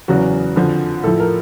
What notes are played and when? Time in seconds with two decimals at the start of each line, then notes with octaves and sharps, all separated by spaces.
0.08 E2 C#3 F#3 F#4
0.56 F2 D3 F3
1.04 A2 F3 A4
1.19 A#4